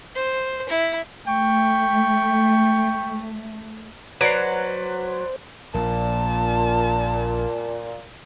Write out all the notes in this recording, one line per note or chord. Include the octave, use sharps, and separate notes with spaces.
C5
E4
A3 G5 C#6
F#3 B4 C5 D5 C7 D7
A#1 A#2 A5